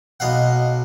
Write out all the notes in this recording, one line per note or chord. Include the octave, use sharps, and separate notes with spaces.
B1 D#5 F5 F#5